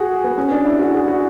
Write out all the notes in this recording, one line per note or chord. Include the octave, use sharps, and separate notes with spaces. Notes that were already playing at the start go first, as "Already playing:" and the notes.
Already playing: F#4 G#4
B3
C#4
D4
E4
F#4
G#4
F#4